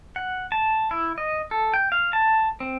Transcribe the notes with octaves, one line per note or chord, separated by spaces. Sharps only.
F#5
A5
E4
D#5
A4
G5
F5
A5
C4